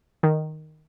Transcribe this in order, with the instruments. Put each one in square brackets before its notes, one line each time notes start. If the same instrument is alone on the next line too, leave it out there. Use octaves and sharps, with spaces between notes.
[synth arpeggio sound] D#3